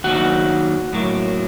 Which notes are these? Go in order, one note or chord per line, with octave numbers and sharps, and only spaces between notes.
D#3 F#3 A#3 D#4 F#4 F#5
A2 F#3 A#3